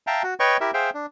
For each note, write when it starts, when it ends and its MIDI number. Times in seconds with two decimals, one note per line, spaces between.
0.07 0.22 76
0.07 0.22 77
0.07 0.22 79
0.07 0.22 81
0.07 0.22 82
0.23 0.34 66
0.40 0.57 71
0.40 0.57 73
0.40 0.57 75
0.40 0.57 79
0.40 0.57 85
0.61 0.71 64
0.61 0.71 67
0.61 0.71 70
0.61 0.71 76
0.74 0.90 68
0.74 0.90 72
0.74 0.90 76
0.74 0.90 77
0.74 0.90 79
0.94 1.06 62